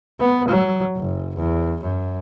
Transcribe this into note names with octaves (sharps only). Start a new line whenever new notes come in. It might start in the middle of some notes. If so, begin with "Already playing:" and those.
B3
F#3
F#1
E2
F#2